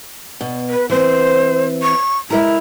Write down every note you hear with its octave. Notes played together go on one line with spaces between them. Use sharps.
B2
B4
E3 C4 C5
C#6
G#3 E4 A#4 A#5